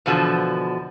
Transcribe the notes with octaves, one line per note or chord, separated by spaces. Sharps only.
E2 B2 D3 D#3 F3